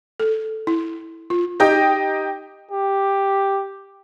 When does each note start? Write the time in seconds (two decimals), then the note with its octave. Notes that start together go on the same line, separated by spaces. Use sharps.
0.20 A4
0.67 E4
1.30 F4
1.60 D#4 G4 D#5 G5
2.71 G4